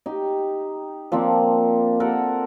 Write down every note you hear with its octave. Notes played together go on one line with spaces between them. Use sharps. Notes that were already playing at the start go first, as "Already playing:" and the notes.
D#4 G4
F3 A#3 C4 D4
A4 A#4 F#5